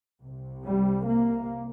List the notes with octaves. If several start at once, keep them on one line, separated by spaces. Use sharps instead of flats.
C2 C3
G3
A#3